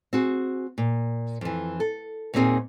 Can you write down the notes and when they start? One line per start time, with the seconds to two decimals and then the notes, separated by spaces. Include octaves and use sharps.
0.13 C4 F#4 G#4
0.78 A#2
1.41 F2 E3
1.80 A4
2.34 D#2 A#2 D#3 C4 G#4 G#5